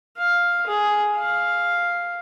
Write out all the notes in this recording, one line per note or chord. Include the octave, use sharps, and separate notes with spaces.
F5
G#4
F5